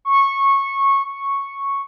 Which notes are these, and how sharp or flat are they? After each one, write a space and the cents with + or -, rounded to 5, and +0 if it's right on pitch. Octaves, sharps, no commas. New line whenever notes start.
C#6 -15
C#6 -5